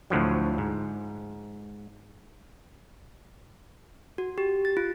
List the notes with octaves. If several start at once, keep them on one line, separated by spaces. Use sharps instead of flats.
D2 A2 D3 F3 F#3
G#2
F#4
G4
A6
F4